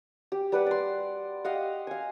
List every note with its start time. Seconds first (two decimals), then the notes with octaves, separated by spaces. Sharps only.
0.32 G4
0.52 G3 B4 D5 F#5
0.66 D5 C6
1.44 G4 D#5 F5 F#5
1.87 F5 G#5